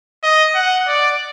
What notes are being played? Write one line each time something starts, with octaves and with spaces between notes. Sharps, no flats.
D#5
F#5
D5